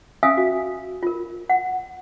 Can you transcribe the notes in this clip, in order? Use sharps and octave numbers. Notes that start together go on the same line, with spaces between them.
C#4 E5 F5 G#5 D#6 E6
F#4
F4 A#4
F#5